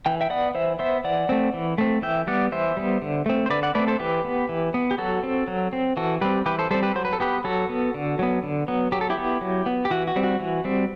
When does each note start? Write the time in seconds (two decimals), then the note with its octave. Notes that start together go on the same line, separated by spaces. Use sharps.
0.06 E3 G5
0.21 E5 G5
0.30 B3 D5 F#5
0.55 E3 C5 E5
0.79 B3 C5 E5
1.04 E3 D5 F#5
1.29 A3 C4
1.54 E3
1.78 A3 C4
2.02 E3 E5 G5
2.27 G3 B3 D5 F#5
2.52 E3 C5 E5
2.77 G3 B3
3.02 D3
3.26 A3 C4
3.46 C5
3.50 D3 B4 D5
3.63 D5 F#5
3.75 A3 C4 B4 D5
3.88 A4 C5
4.00 E3 G4 B4
4.25 B3
4.49 E3
4.74 B3
4.91 G4
4.98 F#3 F#4 A4
5.23 C4
5.48 F#3
5.73 C4
5.97 E3 F#4 A4
6.21 G3 C4 G4 B4
6.46 E3 G4 B4
6.59 A4 C5
6.71 G3 C4 A4 C5
6.83 G4 B4
6.96 F#3 C5
7.05 B4
7.13 A4
7.20 B3 G4 B4
7.44 F#3 F#4 A4
7.69 B3
7.94 D3
8.19 F#3 B3
8.43 D3
8.68 F#3 B3
8.92 F#3 G4
9.01 A4
9.10 E4 G4
9.18 B3
9.41 F#3
9.66 B3
9.85 G4
9.91 E3 F#4
10.08 F#4
10.16 G3 C4
10.24 F#4
10.40 E3
10.65 G3 C4